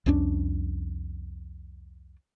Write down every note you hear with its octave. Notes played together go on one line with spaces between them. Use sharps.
C2 F2 C#4 D4